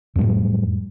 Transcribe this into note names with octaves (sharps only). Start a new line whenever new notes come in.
F2 A2 F#3 G3